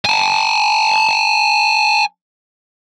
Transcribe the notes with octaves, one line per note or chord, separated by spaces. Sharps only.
G#5 A5